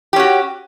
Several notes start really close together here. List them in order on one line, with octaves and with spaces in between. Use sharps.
G4 C#4 F#4